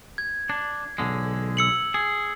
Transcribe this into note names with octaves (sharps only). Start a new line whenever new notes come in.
G#6
D4
B1 D3 G#3
E6 C#7 F#7
G#4